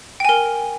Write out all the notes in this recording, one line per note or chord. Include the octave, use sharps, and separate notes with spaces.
A#4 G5 G#5